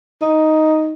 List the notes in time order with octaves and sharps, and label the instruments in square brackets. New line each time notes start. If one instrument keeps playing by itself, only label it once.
[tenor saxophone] D#4